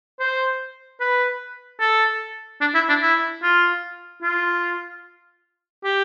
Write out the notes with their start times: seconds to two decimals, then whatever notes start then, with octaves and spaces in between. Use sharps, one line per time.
0.20 C5
1.00 B4
1.80 A4
2.61 D4
2.74 E4
2.89 D4
3.02 E4
3.43 F4
4.23 F4
5.84 G4